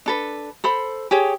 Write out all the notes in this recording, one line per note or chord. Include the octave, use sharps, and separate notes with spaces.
D4 A4 B4
A4 C5 B5
G4 G#4 C#5